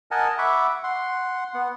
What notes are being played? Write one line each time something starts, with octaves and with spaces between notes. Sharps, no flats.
A#4 D#5 F#5 G#5 A5
E5 F#5 B5 C#6 D6
F#5 C6
B3 F#5